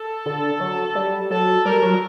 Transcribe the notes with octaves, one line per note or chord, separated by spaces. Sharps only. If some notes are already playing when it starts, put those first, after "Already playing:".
Already playing: A4
D3
F#3
G3
F#3 A4
G3 A#4
F#3